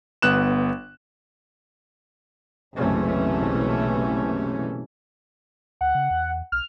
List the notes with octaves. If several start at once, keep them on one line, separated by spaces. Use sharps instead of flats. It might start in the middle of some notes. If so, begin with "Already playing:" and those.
G1 B3 F#6 E7
F#1 B1 C3 E3 A3 C#4
D2 F#5
C#3
E2
B1 F6